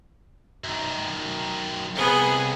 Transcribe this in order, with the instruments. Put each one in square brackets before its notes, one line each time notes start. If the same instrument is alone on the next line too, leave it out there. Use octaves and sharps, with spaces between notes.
[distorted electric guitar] F#2 D#3
[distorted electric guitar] C2 G2 [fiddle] B3 G#4